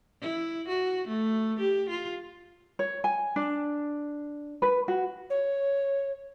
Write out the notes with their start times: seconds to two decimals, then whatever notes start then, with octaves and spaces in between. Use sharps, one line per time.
0.22 E4
0.69 F#4
1.08 A3
1.60 G4
1.90 F4
2.79 C#5
3.04 G#5
3.36 D4
4.62 B4
4.88 F#4
5.30 C#5